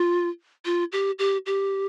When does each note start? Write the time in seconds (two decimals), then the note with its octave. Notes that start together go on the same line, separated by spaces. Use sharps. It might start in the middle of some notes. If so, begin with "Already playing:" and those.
Already playing: F4
0.65 F4
0.92 G4
1.19 G4
1.46 G4